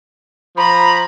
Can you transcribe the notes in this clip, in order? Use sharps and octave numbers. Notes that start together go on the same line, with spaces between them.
F3 A#5 B5